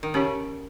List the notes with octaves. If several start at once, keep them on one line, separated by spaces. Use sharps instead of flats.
D#3
C#3 C#4 G4 C#5